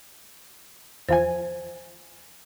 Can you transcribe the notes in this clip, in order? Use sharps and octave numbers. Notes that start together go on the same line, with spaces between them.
E2 F3 C5 G#5